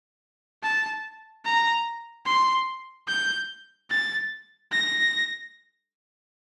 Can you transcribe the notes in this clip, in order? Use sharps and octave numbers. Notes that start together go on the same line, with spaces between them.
A5
A#5
C6
G6
A6
A#6